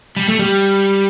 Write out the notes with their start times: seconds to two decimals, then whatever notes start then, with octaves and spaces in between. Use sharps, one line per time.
0.17 G3
0.29 A3
0.39 G3